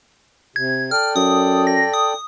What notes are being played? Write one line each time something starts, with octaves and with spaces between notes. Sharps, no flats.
C3 G#6
A4 D5 G5 F6
F#2 D#6
A#6
D#6